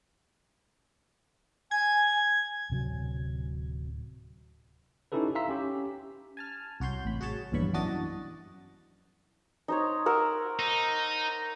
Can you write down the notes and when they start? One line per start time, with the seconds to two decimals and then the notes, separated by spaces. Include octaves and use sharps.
1.71 G#5 G#6
2.70 D1 C3 F#3
5.12 C#4 D#4 E4 G4 A4 B4
5.35 E5 F5 A#5 C6 E6 B6
5.49 C#4 G4
6.37 G#5 A5 F6
6.80 C2 F#4 C#5 C6 G6
7.05 A1 B5
7.21 F#4 G#4 C#5 A5
7.52 A#1 E2 G2 C#5 B5 C#6
7.73 F#2 E3 D4 F#4 D#5 A6
9.68 D#4 C5 C#5
10.06 A#4 F#5 E6
10.59 D#4